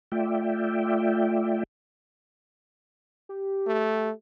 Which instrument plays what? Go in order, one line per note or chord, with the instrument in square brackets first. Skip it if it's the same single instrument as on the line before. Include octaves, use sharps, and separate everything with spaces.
[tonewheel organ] A3 F4 D5 E5 G5
[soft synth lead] G4
[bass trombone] A3